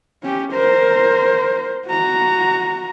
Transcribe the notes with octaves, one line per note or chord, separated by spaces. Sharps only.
C#4 G4
A#4 C5
F#4 A#5